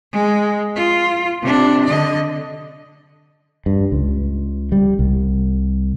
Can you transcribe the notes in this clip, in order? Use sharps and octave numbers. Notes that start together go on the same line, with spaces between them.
G#3
F4
C3 D4
D3 D#5
G2
C#2
G3
C2